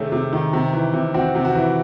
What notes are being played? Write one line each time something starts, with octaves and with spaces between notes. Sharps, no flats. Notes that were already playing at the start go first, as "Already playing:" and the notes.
Already playing: C3 D#3 A3 C#4 G#4
C3
D#3
C3
E3
C3
C4 F#4
C3
F#4
E3